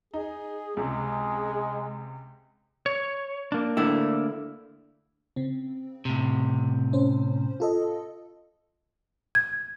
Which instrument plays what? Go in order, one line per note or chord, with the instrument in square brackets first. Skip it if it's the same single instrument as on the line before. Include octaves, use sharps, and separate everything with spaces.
[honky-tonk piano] D#4 [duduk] G#4
[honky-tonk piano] C#2 C3 [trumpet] G#3 [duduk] G#4
[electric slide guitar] C#5
A#3 D4
[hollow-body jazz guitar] D3 A3 E4
[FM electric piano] C#3 C4
[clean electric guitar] A2 C3
[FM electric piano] C#4 C5
F4 A4 D#5
[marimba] G#6